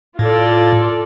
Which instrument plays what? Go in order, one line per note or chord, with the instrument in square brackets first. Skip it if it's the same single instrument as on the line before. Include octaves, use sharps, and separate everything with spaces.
[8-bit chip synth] A2 [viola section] F4 A4 D5